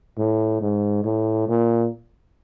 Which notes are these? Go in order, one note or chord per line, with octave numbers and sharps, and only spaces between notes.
A2
G#2
A2
A#2